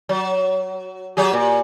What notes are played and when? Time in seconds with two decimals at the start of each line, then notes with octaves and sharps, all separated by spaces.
0.09 F#3
1.17 F#3 G4 G#4
1.33 A#2